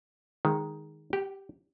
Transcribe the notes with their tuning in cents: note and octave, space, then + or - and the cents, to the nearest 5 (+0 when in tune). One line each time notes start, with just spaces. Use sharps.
D#3 +0 G#3 +0
G4 +0 G5 -45